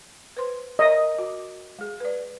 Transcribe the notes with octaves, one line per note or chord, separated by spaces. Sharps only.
B4 C5 C6
A#4 C#5 D#5 E5
F#4
G#3 G#4
B4 D5